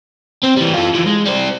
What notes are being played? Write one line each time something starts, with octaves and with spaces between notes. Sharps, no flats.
C4
E3 G3
F4 A4
E3 F3
G#3
G3 C5